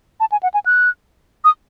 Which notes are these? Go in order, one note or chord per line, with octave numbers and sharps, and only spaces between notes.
A5
G#5
F#5
G#5
F#6
D#6